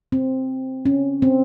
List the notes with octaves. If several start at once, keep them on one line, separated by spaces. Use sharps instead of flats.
C4
C#4
C4